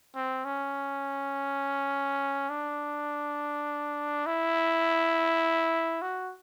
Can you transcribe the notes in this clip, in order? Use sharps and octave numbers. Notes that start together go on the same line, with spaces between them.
C4
C#4
D4
E4
F#4